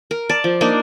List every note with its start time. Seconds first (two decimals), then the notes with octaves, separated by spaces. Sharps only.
0.11 A#4
0.29 D5 A5
0.44 F3
0.61 A#3 D4 D#4